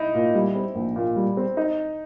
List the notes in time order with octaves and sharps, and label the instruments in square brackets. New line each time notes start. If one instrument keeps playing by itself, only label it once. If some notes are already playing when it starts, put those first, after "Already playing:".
Already playing: [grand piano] D#4 E4
[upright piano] A#2
G3
C4
A#1
A#2
G3
C4
[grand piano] D#4